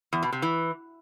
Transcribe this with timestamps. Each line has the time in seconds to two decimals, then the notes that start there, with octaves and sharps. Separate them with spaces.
0.13 E2
0.23 B2
0.32 C3
0.42 E3